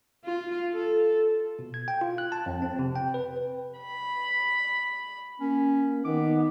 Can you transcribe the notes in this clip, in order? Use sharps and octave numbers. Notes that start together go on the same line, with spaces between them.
F4
A4
B2
G#6
G5
F4
F#6
A5
F2
C4
C3
G5
B4
B5
A#3 C#4
D#3 B3 D6